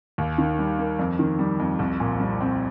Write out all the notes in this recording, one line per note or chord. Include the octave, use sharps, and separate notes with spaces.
D#2
D#3
G3
A#3
F2
D#3
G3
F2
C2
A#2
G3
C4